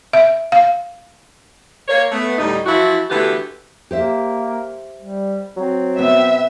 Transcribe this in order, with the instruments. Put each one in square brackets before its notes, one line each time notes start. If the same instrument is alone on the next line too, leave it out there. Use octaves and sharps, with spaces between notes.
[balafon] E5
F5
[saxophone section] A#3 C#5
A3 B3
D2 A2 G3 D#4
E3 F3 E4 F#4
D3 E3 A3 B3 F#4 G4
[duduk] A#3 [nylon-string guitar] G4 C5 E5
[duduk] G3
[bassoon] F#3 [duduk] C4
[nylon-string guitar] B2 B3 [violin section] E5